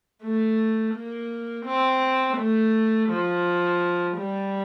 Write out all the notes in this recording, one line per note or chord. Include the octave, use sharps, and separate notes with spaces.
A3
A#3
C4
A3
F3
G3